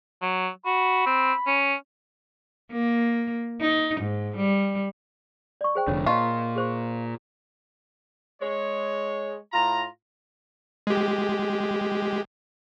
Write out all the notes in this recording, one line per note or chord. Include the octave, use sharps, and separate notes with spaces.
F#3
F#4 B5
C4
C#4
A#3
D#4
G#2
G3
D5 C#6
G#4 C5 G5
F1 D3 C#5
A#2 F4 D#5 A5 C#6
G#4 C5 C#6
G#3 C#5
A2 F4 A#5
G#3 G4